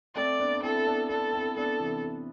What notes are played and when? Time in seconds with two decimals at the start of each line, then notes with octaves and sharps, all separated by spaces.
0.15 A3 C4 D5
0.39 B3 D4
0.54 D4
0.63 C4 E4 A4
0.76 E4
0.87 B3 D4
1.09 B3 D4 A4
1.33 C4 E4
1.57 B3 D4 A4
1.80 C3 E3